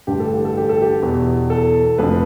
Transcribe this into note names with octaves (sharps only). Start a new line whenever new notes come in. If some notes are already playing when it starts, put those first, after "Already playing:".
A1 G2 D3 G4
A4
G4
A4
G4
A4
G4
E2 B2
A4
F1 F2 D3 B4